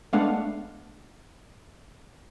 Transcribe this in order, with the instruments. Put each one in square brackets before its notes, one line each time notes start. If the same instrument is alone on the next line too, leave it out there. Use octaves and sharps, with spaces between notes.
[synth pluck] G#3 A3 B3 D4 F5 F#5